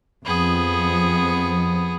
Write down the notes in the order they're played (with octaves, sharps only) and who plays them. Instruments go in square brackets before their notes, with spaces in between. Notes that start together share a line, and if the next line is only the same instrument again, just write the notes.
[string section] F2 [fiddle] B3 G#4